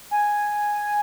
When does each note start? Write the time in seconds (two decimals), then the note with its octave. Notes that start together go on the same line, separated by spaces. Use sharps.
0.11 G#5